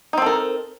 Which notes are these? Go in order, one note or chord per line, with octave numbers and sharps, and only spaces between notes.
C4 D#4 A4 A#4